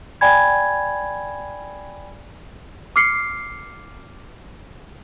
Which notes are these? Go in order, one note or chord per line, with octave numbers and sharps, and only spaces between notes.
D5 G5 G#5 B5 G#6
D6 F6 C7 C#7